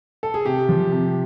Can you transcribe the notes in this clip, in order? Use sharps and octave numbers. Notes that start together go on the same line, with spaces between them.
A4
G#4
C3 G4
F3
C3